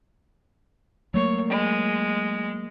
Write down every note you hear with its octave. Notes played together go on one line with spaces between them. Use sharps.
F#3 A3 A#3 C#5
G#3